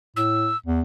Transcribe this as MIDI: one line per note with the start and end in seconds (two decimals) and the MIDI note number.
0.16 0.52 45
0.16 0.57 88
0.66 0.82 40